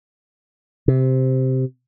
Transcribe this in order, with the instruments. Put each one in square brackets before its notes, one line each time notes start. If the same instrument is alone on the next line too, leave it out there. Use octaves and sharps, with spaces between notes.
[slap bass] C3